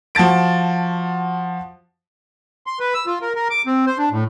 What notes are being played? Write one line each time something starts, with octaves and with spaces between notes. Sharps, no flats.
F3 F#4 A5 A6 D7
C6
B4
E6
F4
A#4
A#4
D6
C4
C5
D4
A2